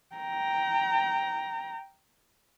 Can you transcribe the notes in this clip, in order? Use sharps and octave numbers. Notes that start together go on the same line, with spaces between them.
G5 A#5